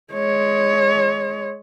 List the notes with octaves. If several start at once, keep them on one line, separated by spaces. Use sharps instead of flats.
G#3 C#5